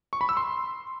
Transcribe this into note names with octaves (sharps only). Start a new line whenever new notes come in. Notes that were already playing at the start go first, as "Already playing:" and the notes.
C#6
B5
E6
C6